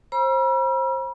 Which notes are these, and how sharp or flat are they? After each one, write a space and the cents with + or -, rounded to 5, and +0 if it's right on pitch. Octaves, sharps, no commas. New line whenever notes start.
C5 +25 B5 -45 E6 +40